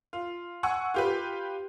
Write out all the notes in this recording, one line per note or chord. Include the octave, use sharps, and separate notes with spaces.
F4
F#5 G#5 C#6 E6
F4 G4 B4